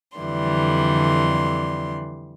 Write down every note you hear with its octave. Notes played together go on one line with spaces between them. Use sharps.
F2 D3 E3 G3 C6